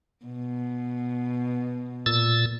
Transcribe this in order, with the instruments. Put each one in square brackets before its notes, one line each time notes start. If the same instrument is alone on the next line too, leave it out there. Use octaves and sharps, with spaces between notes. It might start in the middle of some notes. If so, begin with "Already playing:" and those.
[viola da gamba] B2
[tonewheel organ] A#2 E6 A6